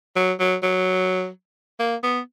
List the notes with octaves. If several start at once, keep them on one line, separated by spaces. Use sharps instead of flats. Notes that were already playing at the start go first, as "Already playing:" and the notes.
F#3
F#3
F#3
A#3
B3